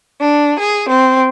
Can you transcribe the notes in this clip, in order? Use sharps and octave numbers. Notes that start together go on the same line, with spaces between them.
D4
G#4
C4